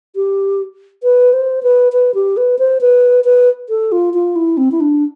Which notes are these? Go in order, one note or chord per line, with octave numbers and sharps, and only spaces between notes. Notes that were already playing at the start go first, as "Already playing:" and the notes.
G4
B4
C5
B4
B4
G4
B4
C5
B4
B4
A4
F4
F4
E4
C4
E4
D4